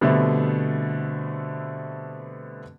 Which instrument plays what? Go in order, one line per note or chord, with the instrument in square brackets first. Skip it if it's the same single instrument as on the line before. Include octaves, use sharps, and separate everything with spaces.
[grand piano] B2 D3 G3 A3 B3 C4